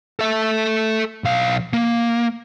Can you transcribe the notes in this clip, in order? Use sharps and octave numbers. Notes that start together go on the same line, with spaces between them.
A4 E5
B1 F5
A#3